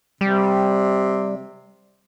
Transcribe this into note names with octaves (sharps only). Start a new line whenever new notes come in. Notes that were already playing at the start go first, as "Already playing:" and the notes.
C3 G3